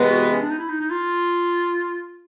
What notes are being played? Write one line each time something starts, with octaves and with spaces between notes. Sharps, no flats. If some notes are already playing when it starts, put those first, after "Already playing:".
Already playing: C3 E3 G#3 B3
F#4
C#4
D4
D#4
E4
D#4
D#4
F4